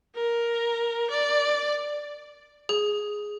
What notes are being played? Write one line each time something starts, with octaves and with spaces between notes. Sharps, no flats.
A#4
D5
G#4